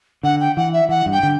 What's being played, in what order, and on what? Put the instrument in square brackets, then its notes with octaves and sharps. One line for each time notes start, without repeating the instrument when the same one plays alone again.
[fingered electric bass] D3 [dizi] F#5
[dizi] G5
[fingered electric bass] E3 [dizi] F#5
[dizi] E5
[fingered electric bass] E3 [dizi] F#5
[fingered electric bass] G2
[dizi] G5
[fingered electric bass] D3